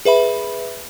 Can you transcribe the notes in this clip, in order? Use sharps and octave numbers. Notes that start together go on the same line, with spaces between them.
G#4 B4 E5 B5